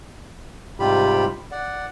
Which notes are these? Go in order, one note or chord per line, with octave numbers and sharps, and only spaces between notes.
G#2 C3 G3 F4 G4 B5
D5 F#5